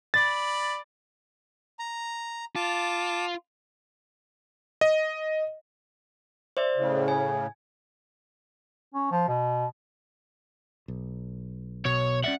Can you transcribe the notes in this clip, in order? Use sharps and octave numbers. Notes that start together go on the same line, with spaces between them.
D5 B5 A6
A#5
F4 A5 D6
D#5
C5 D5 E5
A2 C#3
G#5
C#4
F3
B2
B1
B2 C#5
C#4 D5 E5 F#5